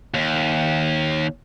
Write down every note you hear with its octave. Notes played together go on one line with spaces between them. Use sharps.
D#2